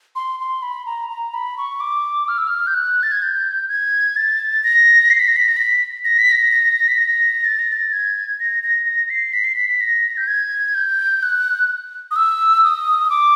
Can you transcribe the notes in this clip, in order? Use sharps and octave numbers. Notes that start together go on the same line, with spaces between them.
C6
C6
B5
A#5
A#5
B5
C#6
D6
F6
E6
F6
G6
F#6
A6
G#6
G6
G#6
A6
A#6
C7
B6
A#6
B6
A#6
B6
A#6
B6
A#6
A#6
B6
A#6
A6
A#6
A6
G#6
A#6
A#6
A#6
C7
B6
C7
B6
B6
A#6
G6
G#6
G6
F#6
D#6
E6
D#6
D6